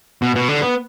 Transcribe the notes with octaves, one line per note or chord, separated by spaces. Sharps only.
B2
B2
D3
B3